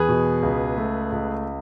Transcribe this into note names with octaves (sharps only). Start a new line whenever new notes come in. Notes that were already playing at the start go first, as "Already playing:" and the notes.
Already playing: E2 G#4 B4
B2
C#2
A3
C#2